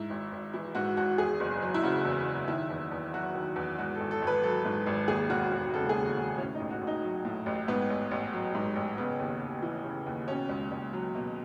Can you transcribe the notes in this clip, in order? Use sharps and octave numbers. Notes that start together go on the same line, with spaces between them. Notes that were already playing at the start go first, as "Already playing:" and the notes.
Already playing: G#2 E4
G#1
G#1
E3 E4
G#2 F#4
G#1 F#4
E2 G#4
F#1
F#3
E4
C#3 F#4
E2
F#1
D#3 E4
E2
E2
F#3 F#4
D#3
E2
G#2 F#4
A4
G#1
A4
G#1
B4
F#3 A4
G#2
G#1
D#2 G#4
E1 F#4
E1
C#3 A4
G#4
D#2
F#4
E1
A2 C#4
D#4
A1
F#4
A1
D#4
F#3
A2
A1
G#2 B3
A1
A1
F#3
G#2
A1
C#3 B3
D#2
D#2
E3
C#3
D#2
B2 C#4
C#2
C#2
F#3
B2